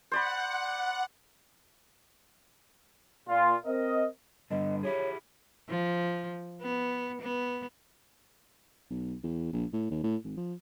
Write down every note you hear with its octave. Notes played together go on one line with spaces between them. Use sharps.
C5 D5 F#5 B5
A#2 F4
C4 A#4 D#5
G2 D3 B3 D#5
E4 G4 G#4 C#5
F3
B3
B3
B1
E2
A#1
A2
D#2
A2
G#1
F3